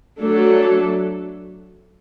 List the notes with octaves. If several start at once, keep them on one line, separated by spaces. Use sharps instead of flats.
F#3 A3 D4 A4